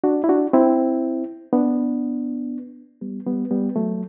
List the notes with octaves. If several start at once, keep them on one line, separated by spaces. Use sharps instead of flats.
D4 F#4
E4
D4 F#4
C4 E4
B3 D4
G3 B3
G3 B3
G3 B3
F#3 A3